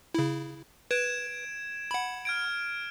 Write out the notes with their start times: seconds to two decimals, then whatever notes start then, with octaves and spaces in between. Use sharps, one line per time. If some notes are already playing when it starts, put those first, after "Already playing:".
0.14 C#3 E4
0.91 B4 G#6 D7 E7
1.91 F#5 B5
2.25 F6 G#6 D7